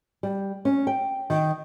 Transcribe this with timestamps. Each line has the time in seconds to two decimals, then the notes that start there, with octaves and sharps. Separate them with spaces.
0.23 G3
0.65 C#4
0.87 G5
1.30 D#3